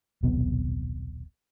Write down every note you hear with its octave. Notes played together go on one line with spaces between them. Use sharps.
D#1 B1 C3 B3